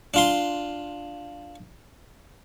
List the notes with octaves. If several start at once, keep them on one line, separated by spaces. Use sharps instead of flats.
D4 F4 C6